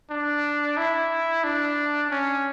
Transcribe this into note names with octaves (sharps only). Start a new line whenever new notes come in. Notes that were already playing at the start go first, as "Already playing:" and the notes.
D4
E4
D4
C#4